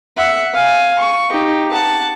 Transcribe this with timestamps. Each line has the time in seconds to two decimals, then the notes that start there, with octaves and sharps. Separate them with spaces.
0.17 E5 F#5
0.53 F5 G#5
0.99 C#6
1.31 D#4 G4
1.72 F#5 A5